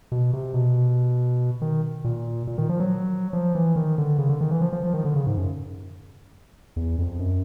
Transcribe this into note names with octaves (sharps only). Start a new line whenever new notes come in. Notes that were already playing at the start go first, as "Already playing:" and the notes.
B2
C3
B2
D#3
A#2
A#2
D#3
F3
F#3
F3
E3
D#3
D3
C#3
D3
D#3
E3
F3
F3
F3
D#3
D3
C#3
G#2
F#2
E2
F2
F#2